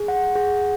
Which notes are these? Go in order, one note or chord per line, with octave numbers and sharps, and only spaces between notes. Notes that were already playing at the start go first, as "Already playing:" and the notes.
Already playing: G#4
F#5
G#4